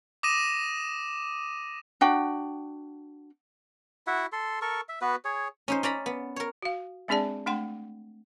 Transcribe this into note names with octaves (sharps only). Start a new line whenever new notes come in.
D6 D#6 A#6 D#7 E7
D4 F#4 F#5 G5
E4 F#4 E5 F#5
A4 C6
A4 A#4 C#6
E5
B3 F#4 B4
G#4 C#5
C#4 D#4 C5
C#4 D5 A#5 B5
B3
A#4 C#5
F#4 F5
G#3 C4 D4 G#4 D5 A5
A3 D4 F#5 G5 C6